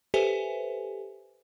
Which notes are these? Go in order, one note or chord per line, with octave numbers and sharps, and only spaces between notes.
G4 A4 B4 C5 E5 G#5